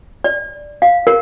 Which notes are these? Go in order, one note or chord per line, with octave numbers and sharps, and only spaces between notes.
D5
F5
A#4